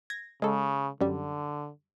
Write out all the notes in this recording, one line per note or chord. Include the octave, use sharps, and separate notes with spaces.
G#6 A#6
C#3 G#3 A4
F#2 D3 G3